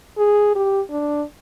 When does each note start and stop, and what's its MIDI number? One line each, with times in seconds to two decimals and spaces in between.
0.18 0.52 68
0.56 0.81 67
0.90 1.23 62